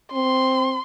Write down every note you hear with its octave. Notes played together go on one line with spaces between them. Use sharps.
C4 C6